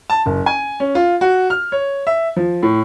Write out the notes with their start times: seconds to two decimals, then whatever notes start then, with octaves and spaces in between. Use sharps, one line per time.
0.10 A5
0.26 F#1
0.46 G#5
0.80 C#4
0.95 F4
1.21 F#4
1.50 F6
1.72 C#5
2.07 E5
2.37 F3
2.63 A2